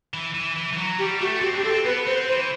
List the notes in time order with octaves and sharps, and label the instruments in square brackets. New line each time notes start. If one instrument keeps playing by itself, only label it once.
[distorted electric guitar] E3
E3
E3
E3
F#3
[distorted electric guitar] G3 [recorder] G4
[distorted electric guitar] A3 [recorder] F#4
[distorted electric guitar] C4 [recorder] G4
[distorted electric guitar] D4 [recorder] G4
[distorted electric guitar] C4 [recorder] A4
[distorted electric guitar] B3 [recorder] B4
[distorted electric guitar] C4 [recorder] C5
[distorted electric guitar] E3 [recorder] C5